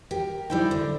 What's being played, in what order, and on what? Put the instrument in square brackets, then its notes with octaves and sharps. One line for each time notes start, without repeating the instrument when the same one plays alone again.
[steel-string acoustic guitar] G4 A#4
[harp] G3 E4 G5 [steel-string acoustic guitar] D#4 C5 D5
[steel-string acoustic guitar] D3